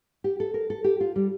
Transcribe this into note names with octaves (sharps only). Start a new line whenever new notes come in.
G4
A4
A#4
A4
G4
F4
G3